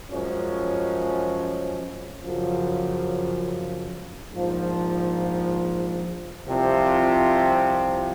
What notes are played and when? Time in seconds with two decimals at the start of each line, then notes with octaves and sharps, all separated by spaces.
0.11 F#2 F3 G#3 C#4
2.23 F#2 C#3 F3
4.34 A#1 G#2 F3
6.46 C2 C3 F3 C4 F4